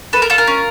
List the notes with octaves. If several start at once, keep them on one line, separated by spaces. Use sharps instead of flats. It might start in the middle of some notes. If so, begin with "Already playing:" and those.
A4 B4
A#4
F4 A4
A#4
C#4